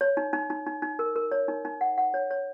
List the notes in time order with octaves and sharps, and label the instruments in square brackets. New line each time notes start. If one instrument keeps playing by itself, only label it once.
[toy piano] C#5
D#4
D#4
D#4
D#4
D#4
A#4
A#4
C#5
D#4
D#4
F#5
F#5
C#5
C#5